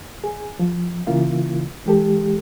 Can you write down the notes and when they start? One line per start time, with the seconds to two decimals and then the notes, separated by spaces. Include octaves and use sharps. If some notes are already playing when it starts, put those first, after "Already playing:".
0.24 G#4
0.59 F3
1.07 C#3 E3 A#3 E4 F4
1.86 E3 G#3 G4 A4